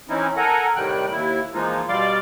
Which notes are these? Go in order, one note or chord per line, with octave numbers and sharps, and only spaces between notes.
E3 C4 C#4 D#4 E4
A4 A#4 F#5 G#5 A#5
A2 C3 D#3 G3 G5 F#6
D#2 E4
E3 F3 G#3 A#3 D#4 F4
B2 G3 D5 F5 C6 D6